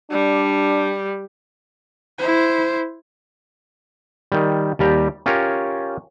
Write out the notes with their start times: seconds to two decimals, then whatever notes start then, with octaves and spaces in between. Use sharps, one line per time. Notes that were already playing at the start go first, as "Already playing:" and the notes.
0.11 G3 D4
2.19 E4 C5
4.32 D#3 G3
4.79 D#2 G3 G4 A#5
5.26 C#4 F4 G4 A#4 C#5